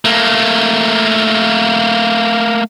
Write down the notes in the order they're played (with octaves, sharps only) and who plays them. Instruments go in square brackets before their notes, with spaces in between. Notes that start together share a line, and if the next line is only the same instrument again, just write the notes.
[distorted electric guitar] A3 A#3